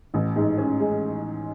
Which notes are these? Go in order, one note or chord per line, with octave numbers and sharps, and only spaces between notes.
A1
G#2
C#4
G#3